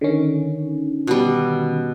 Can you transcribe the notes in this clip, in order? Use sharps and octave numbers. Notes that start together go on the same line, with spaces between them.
D3 D#3 C#4
B2 G3